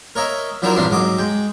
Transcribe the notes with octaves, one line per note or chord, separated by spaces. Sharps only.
A#4 C#5 D#5 E5
F3 F#3 D4 E4 A#4 C5
A#1 G2 C3 E3 D4 C6
G#2 F#3 D6 D#6
G#3 G5